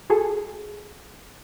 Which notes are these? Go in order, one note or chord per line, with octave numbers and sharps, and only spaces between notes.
F#4 G#4 A4